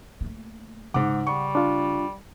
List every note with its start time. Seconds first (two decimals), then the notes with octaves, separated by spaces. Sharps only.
0.21 A3 A#3
0.94 G#2 C#3 F#5 D6
1.27 G3 C#6
1.55 D4 F4